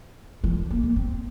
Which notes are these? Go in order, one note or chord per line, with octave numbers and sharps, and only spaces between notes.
F3
G3
A#3
A#3
C4